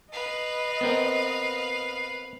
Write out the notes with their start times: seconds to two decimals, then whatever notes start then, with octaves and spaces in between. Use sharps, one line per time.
0.12 B4 D#5 F5
0.81 B3 C4 A#4